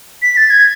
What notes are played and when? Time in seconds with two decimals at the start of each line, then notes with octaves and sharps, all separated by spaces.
0.22 B6
0.37 A6
0.50 G#6